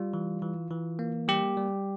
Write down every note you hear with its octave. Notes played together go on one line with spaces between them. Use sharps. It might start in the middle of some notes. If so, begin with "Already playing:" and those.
Already playing: G3 F4
E3
E3
E3
A#3
G3 G4
G3